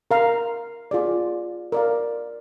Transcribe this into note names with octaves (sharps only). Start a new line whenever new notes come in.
A#4 F5 A#5
F4 G#4 D5
A#4 D5 F5